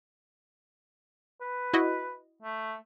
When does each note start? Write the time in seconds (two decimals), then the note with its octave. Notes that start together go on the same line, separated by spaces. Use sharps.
1.41 B4
1.74 E4 F#4 D#5
2.42 A3